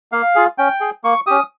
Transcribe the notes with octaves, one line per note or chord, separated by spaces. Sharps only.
A#3 F5
F4 G#4
C#4 G5
G#4
A#3 C#6
C#4 G4 D#6